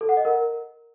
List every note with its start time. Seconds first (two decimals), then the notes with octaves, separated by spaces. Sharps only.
0.01 A4
0.09 F#5
0.17 D#5
0.25 A#4